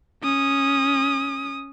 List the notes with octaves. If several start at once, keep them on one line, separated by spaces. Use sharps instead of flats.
C#4 D#6